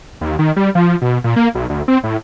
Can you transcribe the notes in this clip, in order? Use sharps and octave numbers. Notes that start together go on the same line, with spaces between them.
D#2
D#3
G3
F3
B2
A#2
A#3
B1
D2
C4
A2